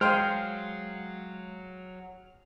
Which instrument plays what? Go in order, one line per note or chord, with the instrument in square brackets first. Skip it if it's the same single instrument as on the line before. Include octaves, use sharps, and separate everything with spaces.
[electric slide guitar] F#3 [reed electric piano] G#3 F5 [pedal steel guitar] G#4 F6 [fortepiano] C5 G5 C6